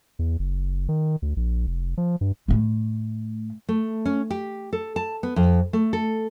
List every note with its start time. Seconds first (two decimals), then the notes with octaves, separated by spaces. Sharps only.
0.19 E2
0.39 F#1
0.89 D#3
1.22 D2
1.37 A#1
1.67 F1
1.97 F3
2.21 G2
2.48 A2 A3
3.69 A3
4.05 C#4
4.30 G4
4.73 A4
4.96 A5
5.23 B3
5.36 F2
5.73 A3
5.93 A4